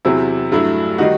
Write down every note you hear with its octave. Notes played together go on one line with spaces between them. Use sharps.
E2 C3 F#3 C4 E4
G2 F#3 A3 E4
D#3 G3 D#4 F#4